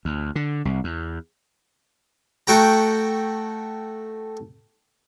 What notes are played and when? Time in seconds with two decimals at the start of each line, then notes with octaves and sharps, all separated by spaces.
0.05 D2
0.35 D3
0.65 C2
0.84 E2
2.47 A3 F#4 G5 A#5